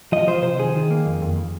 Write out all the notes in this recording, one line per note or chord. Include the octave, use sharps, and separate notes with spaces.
F3 D#5
F3 C5
C3 C5
D#3 G#4
D#3
A#3
F2
F2